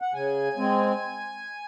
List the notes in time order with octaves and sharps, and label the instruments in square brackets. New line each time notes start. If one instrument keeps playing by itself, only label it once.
[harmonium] F#5
C#3 G#5
G#3 C4